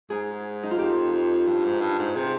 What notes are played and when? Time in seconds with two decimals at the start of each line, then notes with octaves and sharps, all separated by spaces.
0.10 G#2 G#4
0.63 D#4
0.71 F4
0.78 F2 G4
1.47 G2
1.65 G#2
1.80 G2
1.99 G#2
2.16 C3 G#4